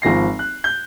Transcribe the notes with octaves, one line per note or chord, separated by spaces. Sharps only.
G#1 F3 A#6 C7
F#6
G6